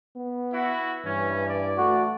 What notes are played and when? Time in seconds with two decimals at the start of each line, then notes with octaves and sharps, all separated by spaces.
0.16 B3
0.53 E4 F#4
1.05 G2 E3 C#4
1.48 D5
1.78 A3 F#4